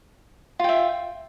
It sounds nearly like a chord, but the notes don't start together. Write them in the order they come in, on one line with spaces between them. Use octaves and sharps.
F4 G5 E5